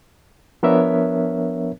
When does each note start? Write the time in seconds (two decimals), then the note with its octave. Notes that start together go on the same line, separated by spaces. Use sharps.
0.63 F3 B3 D4 A#4 C#5 E5